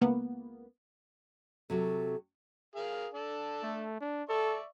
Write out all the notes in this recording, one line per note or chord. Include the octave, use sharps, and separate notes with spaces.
C#2 A#3 B3
C3 F#3 F#4 A4
G#4 A#4 F5
D4 A4 A5
A3
D4
A4 D5 E5 C#6